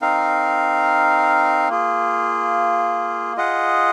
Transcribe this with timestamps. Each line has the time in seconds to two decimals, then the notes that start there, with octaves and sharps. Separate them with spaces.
0.02 C4 D#4 A#4 F5
1.69 A#3 F4 G#4
3.36 F4 G#4 D#5 F#5